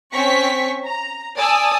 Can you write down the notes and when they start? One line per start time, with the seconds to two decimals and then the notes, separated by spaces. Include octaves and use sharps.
0.11 C4 C#4 C#6 B6
0.86 A#5
1.38 D5 G#5 A5 D#6 E6